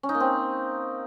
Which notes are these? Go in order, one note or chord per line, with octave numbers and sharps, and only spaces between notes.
C#4
D#4
A#3
C4